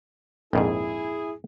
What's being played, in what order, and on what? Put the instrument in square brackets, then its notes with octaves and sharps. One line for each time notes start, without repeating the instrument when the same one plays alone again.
[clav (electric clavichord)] A#1 F2 G#2 [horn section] E4 G#4